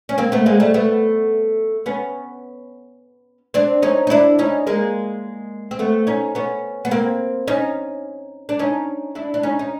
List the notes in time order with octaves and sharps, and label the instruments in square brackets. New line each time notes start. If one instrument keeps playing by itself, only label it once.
[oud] C#4
A#3 C4
A3 B3
G#3 A#3
G3 A3
A3 B3
B3 C#4
C4 D4
C#4 D#4
D#4
D4 E4
C#4 D#4
G#3 A#3
C4
A3 B3
C#4 D#4
B3 C#4
B3
A#3 C4
C#4 D#4
D4
C#4 D#4
D4 E4
D4
C#4 D#4
D#4